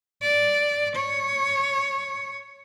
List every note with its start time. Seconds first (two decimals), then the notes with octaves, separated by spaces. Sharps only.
0.22 D5
0.95 C#5